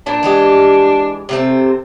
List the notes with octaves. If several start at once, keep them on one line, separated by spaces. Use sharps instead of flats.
A#2 D4
E3 G#3 G4
C3 A3 C4